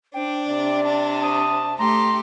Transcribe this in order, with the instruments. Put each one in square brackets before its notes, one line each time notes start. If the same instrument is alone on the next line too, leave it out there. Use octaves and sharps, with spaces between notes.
[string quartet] D4 [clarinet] C5 [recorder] G5
[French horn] C3 [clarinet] D5
[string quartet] D4 [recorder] A5
[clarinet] D#6
[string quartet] A3 G4 [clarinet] A#5 [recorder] C6